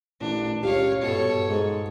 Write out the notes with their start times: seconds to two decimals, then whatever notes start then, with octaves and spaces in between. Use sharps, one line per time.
0.20 A1 A#2 D4
0.63 C#2 G4 C#5 F5
1.02 G2 B2 A4 C#5 D7
1.49 G#2